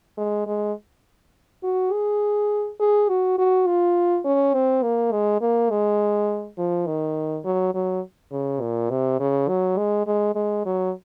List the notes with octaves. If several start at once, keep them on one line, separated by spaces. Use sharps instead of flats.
G#3
G#3
F#4
G#4
G#4
F#4
F#4
F4
C#4
C4
A#3
G#3
A#3
G#3
F3
D#3
F#3
F#3
C#3
A#2
C3
C#3
F#3
G#3
G#3
G#3
F#3